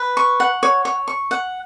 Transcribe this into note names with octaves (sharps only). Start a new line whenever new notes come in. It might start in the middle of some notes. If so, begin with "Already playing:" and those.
Already playing: B4
C#6
F#5
C#5
C#5
C#6
F#5